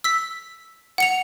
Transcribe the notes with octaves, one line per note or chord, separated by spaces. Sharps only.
E6 B6
F#5 C#7 F7